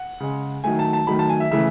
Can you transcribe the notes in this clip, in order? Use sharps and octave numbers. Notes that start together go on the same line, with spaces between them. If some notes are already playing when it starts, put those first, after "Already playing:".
Already playing: F#5
C#3 G#3
D#3 F#3 A3 G#5
A5
A5
D#3 F#3 A3 B5
A5
G#5
E5
C#3 E3 A3 E5